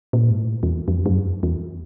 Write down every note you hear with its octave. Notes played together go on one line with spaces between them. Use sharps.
A#2
G#2
A2
E2
F2
F#2
E2